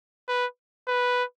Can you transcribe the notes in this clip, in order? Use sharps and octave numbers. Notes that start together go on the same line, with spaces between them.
B4
B4